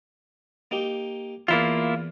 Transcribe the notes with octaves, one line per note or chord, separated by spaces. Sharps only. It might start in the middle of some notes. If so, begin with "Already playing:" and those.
A#3 D#4 G4
E2 A#3 E4 F4 A5